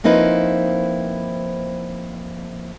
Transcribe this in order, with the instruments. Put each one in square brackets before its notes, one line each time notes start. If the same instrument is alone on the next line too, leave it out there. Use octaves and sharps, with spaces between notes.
[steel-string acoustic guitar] F3 A#3 C4 D#4 E4 B4